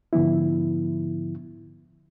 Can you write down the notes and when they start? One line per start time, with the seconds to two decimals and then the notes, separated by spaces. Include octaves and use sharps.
0.13 G#2 D3 F3 B3 E4